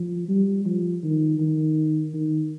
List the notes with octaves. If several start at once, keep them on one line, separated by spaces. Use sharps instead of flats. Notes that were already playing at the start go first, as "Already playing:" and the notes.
Already playing: F3
G3
F3
D#3
D#3
D#3